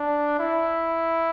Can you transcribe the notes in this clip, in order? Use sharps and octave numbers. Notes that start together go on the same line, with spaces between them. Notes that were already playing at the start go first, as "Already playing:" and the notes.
Already playing: D4
E4